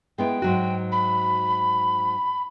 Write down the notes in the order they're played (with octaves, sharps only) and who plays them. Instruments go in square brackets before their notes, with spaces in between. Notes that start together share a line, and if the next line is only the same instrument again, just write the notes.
[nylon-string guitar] G#3 B3 E4 [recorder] G5
[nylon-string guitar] G#2 F#3 F#4
[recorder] B5